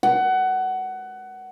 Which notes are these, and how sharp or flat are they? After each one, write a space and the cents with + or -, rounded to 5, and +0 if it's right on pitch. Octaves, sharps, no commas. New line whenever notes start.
F#5 +20